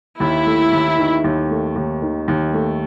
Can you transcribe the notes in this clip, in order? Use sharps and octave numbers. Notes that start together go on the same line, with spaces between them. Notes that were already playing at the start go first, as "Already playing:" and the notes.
D#2 E4
A3
D#2
D#3
D#2
A3
D#2
D#3
D#2
A3